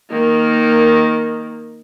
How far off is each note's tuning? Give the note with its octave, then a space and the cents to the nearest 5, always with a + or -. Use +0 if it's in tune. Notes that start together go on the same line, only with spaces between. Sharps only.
D#3 +0 A#3 -5